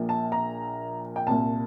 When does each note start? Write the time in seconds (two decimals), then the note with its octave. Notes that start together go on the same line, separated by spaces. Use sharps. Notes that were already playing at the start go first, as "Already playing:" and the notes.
Already playing: A#1 A#2
0.09 A5
0.32 A#5
1.16 G5
1.27 C2 A#2 A5